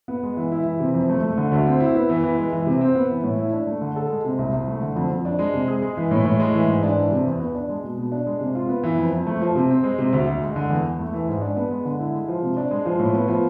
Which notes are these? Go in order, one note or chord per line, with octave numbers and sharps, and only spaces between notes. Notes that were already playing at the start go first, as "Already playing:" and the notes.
B3
G#3
E3
E4
E3
C3
F2
A3
A3
D3
D2
C4
E4
B3
E3
E3
G#3
E3
C3
C4
B3
E3
A2
E4
D4
A3
D3
A4
G#3
C3
C2
C2
A3
D3
F2
F2
D4
G#3
C3
G#4
G#3
E3
A2
A2
G#3
E3
G#2
D4
E3
C3
E2
B3
D4
G#3
B2
B2
D4
G#3
C3
F4
B3
E3
F2
F2
A3
F3
C3
C4
G#3
C3
D2
D2
G#3
D3
E2
E2
A3
E3
G#2
D4
B3
G#3
D3
E4
G#3
F3
C3
D4
G#3
F3
A2
B3
F3